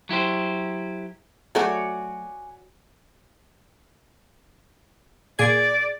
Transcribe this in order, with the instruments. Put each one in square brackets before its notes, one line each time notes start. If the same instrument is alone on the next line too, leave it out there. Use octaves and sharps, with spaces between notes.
[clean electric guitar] F#3 E4 G4 C5
[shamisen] F#3 A3 G#4 [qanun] F#4 C#5 D5 [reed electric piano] G#5
[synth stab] A#2 G#4 G#6 [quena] D5